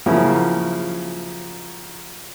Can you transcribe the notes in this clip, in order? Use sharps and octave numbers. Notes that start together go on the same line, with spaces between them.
C#3 F3 F#3 A#3 E4 F#4